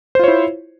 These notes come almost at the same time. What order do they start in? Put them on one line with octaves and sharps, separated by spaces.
C5 F4 C#5 E4